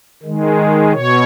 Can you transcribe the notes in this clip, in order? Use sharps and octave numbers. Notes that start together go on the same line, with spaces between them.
D#3 G#3
B2 C#5